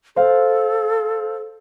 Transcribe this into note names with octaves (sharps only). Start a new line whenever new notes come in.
A4 C5 F5